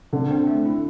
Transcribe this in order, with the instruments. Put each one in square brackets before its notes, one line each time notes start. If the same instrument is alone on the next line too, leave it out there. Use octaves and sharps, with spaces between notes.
[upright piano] D3 [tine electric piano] C4
[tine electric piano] C4
A3
E4